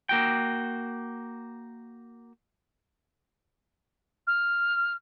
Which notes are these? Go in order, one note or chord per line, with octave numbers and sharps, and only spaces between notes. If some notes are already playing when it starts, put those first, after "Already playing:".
A#3 F#4 G5
F6